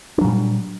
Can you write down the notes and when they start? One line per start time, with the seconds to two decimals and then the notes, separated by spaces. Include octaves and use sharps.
0.18 D4
0.21 F#3
0.25 A#2
0.28 G3